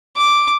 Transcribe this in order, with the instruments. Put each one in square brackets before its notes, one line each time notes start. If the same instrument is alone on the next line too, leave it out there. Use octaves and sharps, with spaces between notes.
[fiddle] D6